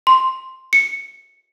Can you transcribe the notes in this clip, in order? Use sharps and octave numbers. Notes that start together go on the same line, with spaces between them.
C6
C#7